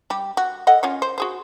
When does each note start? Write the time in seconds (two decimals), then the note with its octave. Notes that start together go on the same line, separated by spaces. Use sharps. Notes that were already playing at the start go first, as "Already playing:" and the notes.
0.10 G3 G4
0.37 F#4
0.67 A4 D#5 F#5
0.83 C#4 F4 C#5
1.02 C5
1.18 F#4 G#4 C5